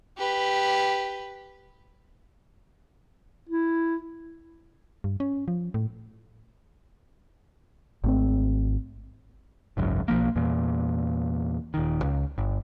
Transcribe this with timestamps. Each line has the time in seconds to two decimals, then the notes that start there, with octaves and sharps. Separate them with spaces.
0.18 G4 B4
3.49 E4
5.04 G2
5.20 C#4
5.48 F3
5.74 A2
8.04 G#1 A3 C4
9.77 G#1 C#2 F#2
10.08 B1 F3 A#3
10.36 E2 A#2
11.74 D#1 D#3
12.02 C#2
12.38 G1